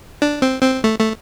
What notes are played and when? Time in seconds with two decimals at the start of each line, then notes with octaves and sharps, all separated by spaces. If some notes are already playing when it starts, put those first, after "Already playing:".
0.22 D4
0.42 C4
0.63 C4
0.84 A3
0.99 A3